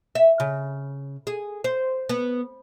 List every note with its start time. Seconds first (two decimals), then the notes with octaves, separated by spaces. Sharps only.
0.15 E5
0.40 C#3
1.27 G#4
1.64 C5
2.09 B3